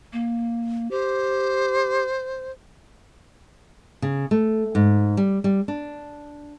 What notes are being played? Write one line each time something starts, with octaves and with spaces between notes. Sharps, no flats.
A#3
G4 C5
C#3
A3
G#2
G3
G3
D4